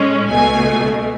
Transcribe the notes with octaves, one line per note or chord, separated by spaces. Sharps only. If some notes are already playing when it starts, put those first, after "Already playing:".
Already playing: A2 G#3 C#4
C#2 B2 A3 G#5